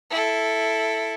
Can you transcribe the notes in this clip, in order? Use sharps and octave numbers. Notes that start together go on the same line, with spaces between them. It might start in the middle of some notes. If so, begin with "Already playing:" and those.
E4 A4